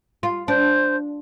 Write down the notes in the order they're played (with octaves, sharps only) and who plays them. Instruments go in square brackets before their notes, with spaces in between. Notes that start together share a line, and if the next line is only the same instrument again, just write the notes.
[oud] F4
[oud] D4 [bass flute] C5